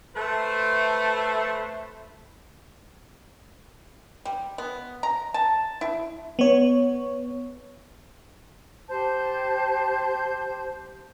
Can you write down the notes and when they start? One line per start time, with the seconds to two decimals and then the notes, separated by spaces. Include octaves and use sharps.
0.16 A3 B4 C5
4.25 G3
4.58 B3
5.03 A#5
5.34 A5
5.81 E4
6.39 B3 C#5
8.89 G4 C5 A5 G6